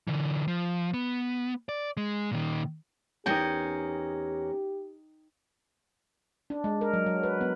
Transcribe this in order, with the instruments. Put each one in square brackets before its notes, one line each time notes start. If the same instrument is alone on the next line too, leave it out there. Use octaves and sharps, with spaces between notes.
[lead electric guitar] D3 E3
F3
B3
D5
G#3
A#2 D#3
[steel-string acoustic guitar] E2 C#4 A#4 [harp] D#4 G5 [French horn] G4
[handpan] D4
G#3
A#4
F#3
F#3
B4
B3